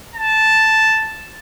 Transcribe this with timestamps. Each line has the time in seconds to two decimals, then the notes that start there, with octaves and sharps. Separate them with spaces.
0.15 A5